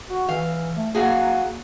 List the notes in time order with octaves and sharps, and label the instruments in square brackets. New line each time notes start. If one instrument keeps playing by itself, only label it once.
[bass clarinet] F#4
[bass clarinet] E3 [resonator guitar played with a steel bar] F5
[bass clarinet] A3
[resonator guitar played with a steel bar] F#3 F#4 G#4 [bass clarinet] A#3